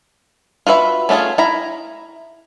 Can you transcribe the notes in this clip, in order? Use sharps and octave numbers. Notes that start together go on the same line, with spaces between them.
F4 F#4 B4 E5
A3 C#4 D4 F4 G#4
E4 A#5